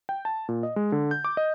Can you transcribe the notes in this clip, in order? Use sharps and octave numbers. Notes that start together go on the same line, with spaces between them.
G5
A5
A#2
D#5
G#3
D3
G6
D6
D#5